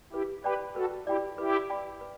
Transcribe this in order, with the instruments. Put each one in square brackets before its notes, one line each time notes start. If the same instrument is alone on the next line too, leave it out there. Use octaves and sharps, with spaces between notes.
[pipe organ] E4 G4 [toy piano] B4
[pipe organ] G4 B4 [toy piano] D5 G5 B5
[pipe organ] F#4 A4 [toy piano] B4
[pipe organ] E4 G4 [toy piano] D5 G5 B5
[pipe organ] E4 G4 [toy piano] B4
[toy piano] D5 G5 B5
B4